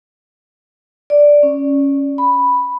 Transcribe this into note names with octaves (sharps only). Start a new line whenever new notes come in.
D5
C#4
B5